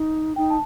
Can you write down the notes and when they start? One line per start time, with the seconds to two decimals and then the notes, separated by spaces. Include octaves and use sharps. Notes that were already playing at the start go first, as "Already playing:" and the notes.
Already playing: D#4
0.36 D#4 G5
0.50 A5